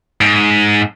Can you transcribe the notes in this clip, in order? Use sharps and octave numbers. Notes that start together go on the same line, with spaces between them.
G#2